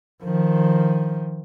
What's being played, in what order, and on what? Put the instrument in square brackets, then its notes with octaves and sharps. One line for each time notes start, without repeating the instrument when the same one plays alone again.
[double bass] D#3 F3